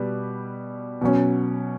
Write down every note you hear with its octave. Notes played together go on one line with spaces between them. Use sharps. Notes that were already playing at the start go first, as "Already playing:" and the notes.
Already playing: B2 G3 G4 B4
B2 F#3 C#4